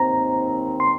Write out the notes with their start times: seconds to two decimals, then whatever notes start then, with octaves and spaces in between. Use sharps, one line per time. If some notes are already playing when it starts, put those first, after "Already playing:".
Already playing: D#2 D#3 C4 A#5
0.80 C6